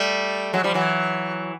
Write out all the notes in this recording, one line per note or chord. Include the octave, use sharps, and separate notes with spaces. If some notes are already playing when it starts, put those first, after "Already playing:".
Already playing: G3 A3
F#3 G#3
F3 G3
E3 F#3